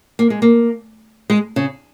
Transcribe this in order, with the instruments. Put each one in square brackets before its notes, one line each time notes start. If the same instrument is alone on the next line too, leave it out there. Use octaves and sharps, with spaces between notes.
[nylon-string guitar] A#3
G#3
A#3
G#3
C#3